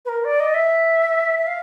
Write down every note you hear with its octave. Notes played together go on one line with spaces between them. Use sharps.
B4
A#4
D5
D#5
E5
E5
F5